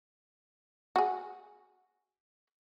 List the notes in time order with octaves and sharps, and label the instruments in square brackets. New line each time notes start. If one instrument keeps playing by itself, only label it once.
[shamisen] F#4 G#4